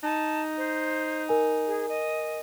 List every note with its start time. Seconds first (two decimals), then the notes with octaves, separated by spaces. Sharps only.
0.03 D#4 A5
0.57 C5
1.29 A#4 G#5
1.67 G#4
1.89 D#5